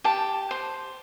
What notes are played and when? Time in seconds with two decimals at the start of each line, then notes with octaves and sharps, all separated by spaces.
0.04 G4 A5
0.51 C5